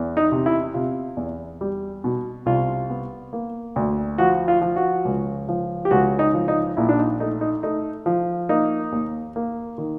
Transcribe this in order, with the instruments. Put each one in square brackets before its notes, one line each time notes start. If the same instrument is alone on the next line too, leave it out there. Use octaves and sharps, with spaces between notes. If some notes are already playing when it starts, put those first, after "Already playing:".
Already playing: [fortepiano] E2
D#4
C3
E4
C3 F4
E2
G3
B2
C2 F4
B3
A#3
D2
F3 F#4
F4
F3
F#4
C#2
F3
G4
C#2 F#4
D#4
F3
D#4
A#1 E4
D4
D#4
A3 D#4
D#4
A3 D#4
F3
A#3 D#4
D#2
A#3
D#3